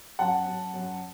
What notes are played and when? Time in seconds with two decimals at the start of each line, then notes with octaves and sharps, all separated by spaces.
0.19 F#2 F#5 A5
0.46 F#2
0.74 F#2